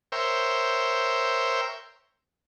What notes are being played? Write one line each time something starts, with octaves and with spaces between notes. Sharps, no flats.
A#4 C5 C#5 E5 G5